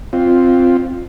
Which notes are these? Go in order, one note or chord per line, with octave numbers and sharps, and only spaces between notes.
C4 F4